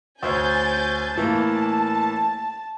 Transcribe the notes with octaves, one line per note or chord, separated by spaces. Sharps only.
D2 C5 C#5 G#5 G6 A6
A2 E3 A#3 A5